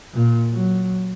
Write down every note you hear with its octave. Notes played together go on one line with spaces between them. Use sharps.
A#2
F#3